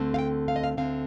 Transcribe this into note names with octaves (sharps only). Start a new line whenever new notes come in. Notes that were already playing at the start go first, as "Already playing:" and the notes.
Already playing: D2 D3 A3 C4
F5
G5
F5
D#5
F5
D2 D3 A3 C4 F5